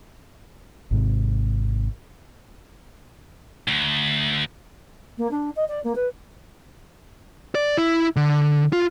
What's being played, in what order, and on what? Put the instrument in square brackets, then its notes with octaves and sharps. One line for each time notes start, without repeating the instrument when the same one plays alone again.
[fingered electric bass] G#1 G#2 C3
[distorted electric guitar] D2
[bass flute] A#3
D4
D#5
D5
A#3
B4
[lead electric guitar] D5
E4
D3
F4